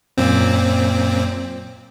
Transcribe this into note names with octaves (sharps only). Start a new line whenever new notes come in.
F#2 A#2 C4